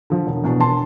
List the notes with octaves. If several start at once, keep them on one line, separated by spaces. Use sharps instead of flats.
D3 F3
E1
E2 B2 B3 D4
E1 A5 C6